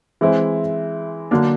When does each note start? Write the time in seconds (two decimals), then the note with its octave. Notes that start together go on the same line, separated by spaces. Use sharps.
0.21 E3 G#3 C4 E4
1.31 D3 F#3 A#3 D4